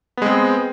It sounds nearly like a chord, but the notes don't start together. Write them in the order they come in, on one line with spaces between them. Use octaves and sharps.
B3 G#3 C4